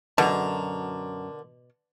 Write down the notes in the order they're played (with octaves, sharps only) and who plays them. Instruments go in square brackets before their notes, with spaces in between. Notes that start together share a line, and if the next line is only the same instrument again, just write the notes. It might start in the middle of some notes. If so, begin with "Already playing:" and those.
[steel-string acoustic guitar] F#2 A4 A#5 [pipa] B2 [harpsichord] D3 [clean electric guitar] A#4 F#5 A5